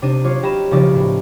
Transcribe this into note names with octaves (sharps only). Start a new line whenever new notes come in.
C3 D4 D#4 D#7
F#3 F4 C#5 D6 C7
F#3 G4 D#5 A#5 B5 E7
B1 C#3 F3 G3 D#4 D5
A2